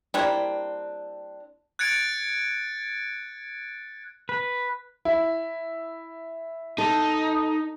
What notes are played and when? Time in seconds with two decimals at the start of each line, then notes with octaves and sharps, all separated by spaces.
0.14 G3 A#3 C4 D4 E4 D5 G5
1.79 F#6 G#6 A6 C#7 D7
4.29 B4
5.05 E4
6.78 D#4 A4